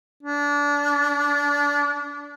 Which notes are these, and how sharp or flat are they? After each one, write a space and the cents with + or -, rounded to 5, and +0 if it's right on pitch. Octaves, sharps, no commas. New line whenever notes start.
D4 -25